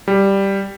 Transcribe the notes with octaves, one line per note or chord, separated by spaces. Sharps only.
G3